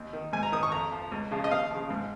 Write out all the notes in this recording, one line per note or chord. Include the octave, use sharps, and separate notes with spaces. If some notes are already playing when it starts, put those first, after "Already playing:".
Already playing: D#2
D#3
G#2 G#5
A#5
D#3 D#6
C#6
F2 A#5
F3
C#2
C#3 F3
D#5
D#2 F5
C#3 F3
G#2